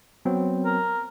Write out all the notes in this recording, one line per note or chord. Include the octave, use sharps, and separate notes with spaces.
F#3 B3 C4
A#4